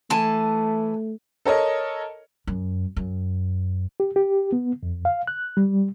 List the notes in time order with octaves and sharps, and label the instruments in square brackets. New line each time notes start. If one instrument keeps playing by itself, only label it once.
[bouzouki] E3 G#5 A5 [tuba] A3
[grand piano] A4 A#4 C#5 D#5
[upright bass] F#2
F#2
[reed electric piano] G4
G4
B3
F2
F5
F#6
G3